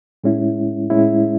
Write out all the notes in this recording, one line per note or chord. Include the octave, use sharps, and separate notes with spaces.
A2 G#3 C#4 E4
A2 G#3 C#4 E4